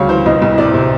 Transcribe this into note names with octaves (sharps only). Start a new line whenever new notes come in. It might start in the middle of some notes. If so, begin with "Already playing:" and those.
Already playing: D2 C#3 G3 C#5 F5
E3 C5
C2 D#5
C2
C3 D5
C3